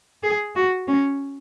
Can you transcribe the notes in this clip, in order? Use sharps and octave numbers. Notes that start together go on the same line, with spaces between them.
G#4
F#4
C#4